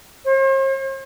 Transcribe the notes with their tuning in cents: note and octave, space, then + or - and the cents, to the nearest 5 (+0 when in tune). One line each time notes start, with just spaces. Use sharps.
C5 +45